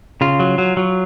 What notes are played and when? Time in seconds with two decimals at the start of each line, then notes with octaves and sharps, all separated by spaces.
0.21 C#3 F4
0.40 F#3
0.58 F#3
0.77 F#3